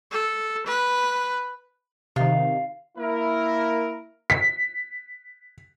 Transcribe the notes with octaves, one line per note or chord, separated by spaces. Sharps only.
A4
B4
C3 D#3 F4
A#3 E4 A#4
B6